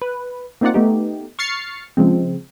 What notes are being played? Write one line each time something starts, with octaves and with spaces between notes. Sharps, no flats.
B4
A#3 C4 D#4 F4 D5 F#5
A3 B3 D#4 G4
C#6 F6 A6 C7 C#7
C#3 F3 G#3 C4